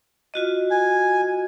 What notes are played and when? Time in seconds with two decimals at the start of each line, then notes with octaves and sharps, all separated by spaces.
0.34 F4 F#4 D#5
0.71 G#5